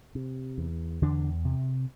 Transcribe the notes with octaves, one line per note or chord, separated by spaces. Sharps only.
C3
E2
E2 D3 D4
C3